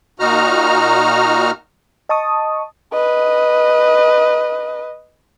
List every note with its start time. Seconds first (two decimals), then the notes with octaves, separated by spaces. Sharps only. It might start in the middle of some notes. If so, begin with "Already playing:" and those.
0.19 A#2 D#4 F#4 A#5 F6
2.09 D#5 A5 C#6 D#6
2.93 B4 D#5